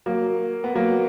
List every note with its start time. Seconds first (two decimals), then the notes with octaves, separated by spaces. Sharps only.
0.06 F#3 A#3
0.64 B3
0.75 F#3 A#3